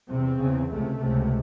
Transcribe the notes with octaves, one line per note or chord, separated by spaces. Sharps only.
E2 C3 C4
E2 C#3
C#2 C3 A3
C#2 C3